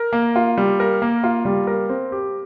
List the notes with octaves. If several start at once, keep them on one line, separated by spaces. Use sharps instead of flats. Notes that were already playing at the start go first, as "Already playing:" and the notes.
Already playing: A#4
A#3
F4
G3
A#4
A#3
F4
G3
A#4
C4
G4